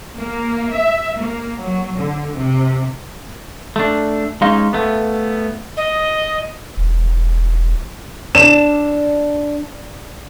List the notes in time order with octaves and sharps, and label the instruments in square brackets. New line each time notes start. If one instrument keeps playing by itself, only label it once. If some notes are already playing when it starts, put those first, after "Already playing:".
[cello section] A#3
E5
A#3
F#3
D3
C3
[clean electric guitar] A3 D4
[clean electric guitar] G#3 C#4 D#4 [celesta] F5
[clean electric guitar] A3 B3
[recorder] D#5
[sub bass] E1
[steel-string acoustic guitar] D4 [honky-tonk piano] E7